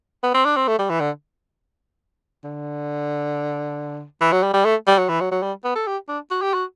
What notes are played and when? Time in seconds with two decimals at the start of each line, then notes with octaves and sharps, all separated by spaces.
0.23 B3
0.34 C4
0.45 D4
0.56 C4
0.68 A3
0.79 G3
0.90 E3
1.00 D3
2.44 D3
4.21 E3
4.32 F#3
4.43 G3
4.54 G3
4.65 A3
4.87 G3
4.98 F#3
5.09 E3
5.20 F#3
5.31 F#3
5.42 G3
5.64 B3
5.75 A4
5.87 G4
6.08 D4
6.31 F#4
6.42 G4
6.53 F#4